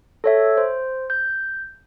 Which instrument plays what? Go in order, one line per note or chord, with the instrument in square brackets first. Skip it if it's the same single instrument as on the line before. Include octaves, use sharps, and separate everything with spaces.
[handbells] A4 C#5 E5
C5
G6